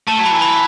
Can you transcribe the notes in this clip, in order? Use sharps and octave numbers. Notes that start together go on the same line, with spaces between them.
A3 A5
F#3
B5
E3
B5